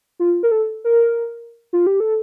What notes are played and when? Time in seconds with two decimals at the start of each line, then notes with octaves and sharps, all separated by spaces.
0.19 F4
0.43 A#4
0.51 A4
0.84 A#4
1.73 F4
1.87 G4
2.00 A4